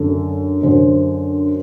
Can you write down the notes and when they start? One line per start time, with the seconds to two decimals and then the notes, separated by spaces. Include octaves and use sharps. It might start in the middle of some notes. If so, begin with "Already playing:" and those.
Already playing: F#2 D3 A4
0.62 F#2 D3 C5